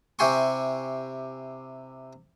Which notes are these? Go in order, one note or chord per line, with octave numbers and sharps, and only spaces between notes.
C3 E4 G4 G#5 C6 C#6